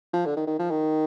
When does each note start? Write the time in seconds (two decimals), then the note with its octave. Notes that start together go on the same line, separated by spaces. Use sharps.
0.13 F3
0.26 D3
0.36 D#3
0.47 D#3
0.59 F3
0.70 D#3